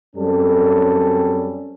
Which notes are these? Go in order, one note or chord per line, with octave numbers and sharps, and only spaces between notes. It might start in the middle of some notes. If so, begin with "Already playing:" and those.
F#2 G3 C4 C#4 A4